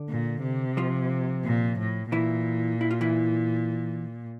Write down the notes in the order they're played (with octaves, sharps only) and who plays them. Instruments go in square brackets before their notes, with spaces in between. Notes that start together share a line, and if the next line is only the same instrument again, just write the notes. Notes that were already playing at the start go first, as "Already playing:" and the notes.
Already playing: [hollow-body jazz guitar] D3 D4
[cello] A#2
C3
[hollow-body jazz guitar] F3 F4
[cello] A#2
A2
[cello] A#2 [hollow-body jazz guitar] E3 E4
[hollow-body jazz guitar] E4
F4
E3 E4